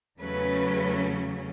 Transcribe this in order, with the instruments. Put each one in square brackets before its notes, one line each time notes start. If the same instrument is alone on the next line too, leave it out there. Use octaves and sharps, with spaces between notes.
[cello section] E2 C#3 F#3 A3 C#4 B4